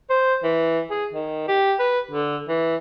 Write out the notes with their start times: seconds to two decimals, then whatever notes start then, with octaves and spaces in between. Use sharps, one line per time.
0.10 C5
0.44 E3
0.91 G#4
1.13 D#3
1.48 G4
1.80 B4
2.11 D3
2.49 E3